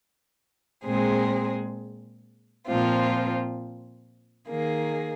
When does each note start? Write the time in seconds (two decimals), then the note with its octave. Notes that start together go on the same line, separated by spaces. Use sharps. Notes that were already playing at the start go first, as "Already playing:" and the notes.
0.84 A#2 G#3 C4 G#4
2.67 A#2 F3 C4 F4
4.48 D#3 A#3 G#4